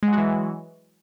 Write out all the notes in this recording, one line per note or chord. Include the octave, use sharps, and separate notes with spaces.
E3 F#3 G#3 F#4